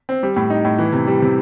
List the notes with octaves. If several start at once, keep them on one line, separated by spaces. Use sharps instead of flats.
C4
G3
A2
D#4
A2
E3
C3
G3
C3